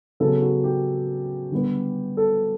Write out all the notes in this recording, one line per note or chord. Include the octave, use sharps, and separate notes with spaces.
C#3 F#3 B3 A4
F#4
G4
D3 G3 B3
A4